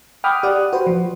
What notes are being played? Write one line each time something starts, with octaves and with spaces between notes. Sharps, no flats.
F#5 G5 B5 D6 D#6 F6
G4 D5 F#5 D#6 F#6
F#4 B4 C5
F3